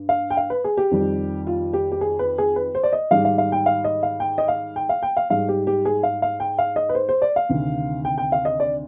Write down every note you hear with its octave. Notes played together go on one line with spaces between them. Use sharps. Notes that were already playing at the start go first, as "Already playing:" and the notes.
Already playing: G2
F5
G5
F5
B4
G#4
G4
F2 D#3 G3
F4
G4
G4
G#4
B4
G#4
B4
C5
D5
D#5
G#2 D#3 G3 F5
F5
F5
G5
F5
D#5
F5
G5
D#5
F5
G5
F5
G5
F5
G#2 G3 F5
G4
G4
G#4
F5
F5
G5
F5
D#5
B4
C5
C5
D5
F5
D2 C3 D#3
G5
G5
F5
D#5
D5